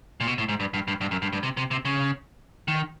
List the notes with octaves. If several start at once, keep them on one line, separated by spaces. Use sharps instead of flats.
A#2
B2
A2
G#2
G2
G2
G2
G2
F#2
G2
G2
C3
C3
C3
C#3
D#3